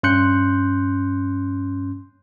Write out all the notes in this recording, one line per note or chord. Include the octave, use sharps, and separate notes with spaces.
G2 C#4 C6 F#6 G6 C#7